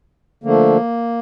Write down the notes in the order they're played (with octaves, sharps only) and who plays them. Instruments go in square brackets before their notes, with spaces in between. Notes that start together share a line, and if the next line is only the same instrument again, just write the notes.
[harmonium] D3 F3 A3 A#3